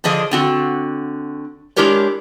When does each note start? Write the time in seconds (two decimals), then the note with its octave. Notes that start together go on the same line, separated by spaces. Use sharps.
0.04 D3 F3 D4 G#4 D#5
0.31 D3 C4 F#4
1.76 G#3 D4 E4 G4 A#4 C#5